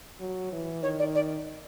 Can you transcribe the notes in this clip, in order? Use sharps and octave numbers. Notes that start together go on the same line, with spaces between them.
F#3
E3
D#3 C#5
D5
D5